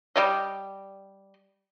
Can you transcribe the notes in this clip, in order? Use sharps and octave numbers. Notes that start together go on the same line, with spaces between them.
G3 D5 D#5